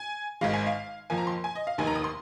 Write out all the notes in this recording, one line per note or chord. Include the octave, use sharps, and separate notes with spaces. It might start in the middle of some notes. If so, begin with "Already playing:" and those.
Already playing: G#5
G#1 G#2 G#3 F5
G#5
F5
F2 F3 A#3 G#5
A#5
C6
G#5
D#5
F5
F1 D#2 D#3 G#5
A#5
D#6
C6